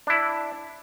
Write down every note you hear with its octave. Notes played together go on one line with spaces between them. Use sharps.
D4 E4